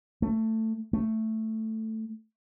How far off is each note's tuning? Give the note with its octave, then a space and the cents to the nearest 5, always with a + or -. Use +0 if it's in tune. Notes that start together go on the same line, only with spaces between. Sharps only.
A3 +15
A3 +5